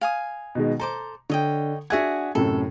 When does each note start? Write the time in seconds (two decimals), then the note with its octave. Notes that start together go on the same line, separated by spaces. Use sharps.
0.01 F5 G#5 D#6
0.55 B2 D#3 G#3
0.80 A4 C5 A#5 D6
1.30 D3 C#5 D#5 G5
1.90 D4 F#4 G#4 E5 F#5 G#6
2.35 F#2 A2 C3 A4